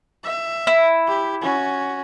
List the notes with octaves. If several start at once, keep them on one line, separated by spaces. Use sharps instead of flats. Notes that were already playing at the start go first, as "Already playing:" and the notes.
E5
E4
G4
C#4 F#4